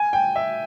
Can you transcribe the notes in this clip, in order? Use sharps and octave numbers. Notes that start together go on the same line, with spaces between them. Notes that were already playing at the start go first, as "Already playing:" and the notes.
Already playing: G#5
G5
E5